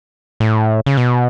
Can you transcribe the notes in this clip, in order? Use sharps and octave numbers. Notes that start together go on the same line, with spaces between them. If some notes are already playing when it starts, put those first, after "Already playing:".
A2
C#3
B2